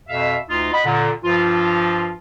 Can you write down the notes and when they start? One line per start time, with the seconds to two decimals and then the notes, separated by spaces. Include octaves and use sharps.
0.08 F2 B2 E5 F5
0.49 D2 D#4 F4
0.73 D#5 F#5 B5
0.85 A#2 D3
1.24 G2 F3 F4